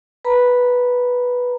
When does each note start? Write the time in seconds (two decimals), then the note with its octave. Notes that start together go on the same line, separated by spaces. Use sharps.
0.25 B4 A#5 B5